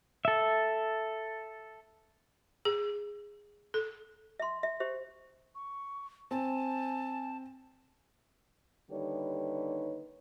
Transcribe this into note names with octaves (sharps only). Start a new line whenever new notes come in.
A4 E5
G#4
A4
E5 C6
E5
G4 C5 E5
C#6
C4 G#5 A5
D#2 D3 G3 D#4 B4 C#5